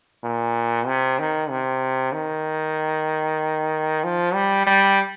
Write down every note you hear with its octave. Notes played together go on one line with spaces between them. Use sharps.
A#2
C3
D#3
C3
D#3
F3
G3
G3